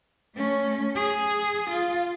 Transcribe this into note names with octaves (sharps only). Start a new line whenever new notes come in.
A3 C#4
G#4
F4